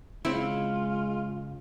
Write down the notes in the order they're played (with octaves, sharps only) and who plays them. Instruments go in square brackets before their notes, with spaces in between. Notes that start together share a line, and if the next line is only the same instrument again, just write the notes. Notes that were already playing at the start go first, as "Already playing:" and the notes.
[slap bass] C#3 [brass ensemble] G#3 [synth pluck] C4 E4 [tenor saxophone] F4